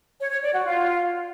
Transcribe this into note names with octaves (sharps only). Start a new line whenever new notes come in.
C#5
C#5
D5
F#4
F4